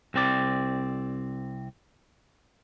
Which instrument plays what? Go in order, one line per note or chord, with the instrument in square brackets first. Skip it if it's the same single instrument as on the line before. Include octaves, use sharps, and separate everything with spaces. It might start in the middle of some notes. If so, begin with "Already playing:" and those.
[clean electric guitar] C2 C4 D5